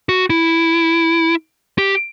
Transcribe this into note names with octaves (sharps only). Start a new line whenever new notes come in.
F#4
E4
G4